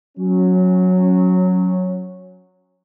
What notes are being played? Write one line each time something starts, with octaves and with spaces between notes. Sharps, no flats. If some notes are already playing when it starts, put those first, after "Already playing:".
F#3 C#4